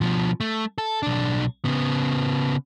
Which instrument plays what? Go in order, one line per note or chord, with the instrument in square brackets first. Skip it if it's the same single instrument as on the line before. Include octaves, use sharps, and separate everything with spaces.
[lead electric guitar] B2 F3
A3
A4
B1 D4
C#3 B3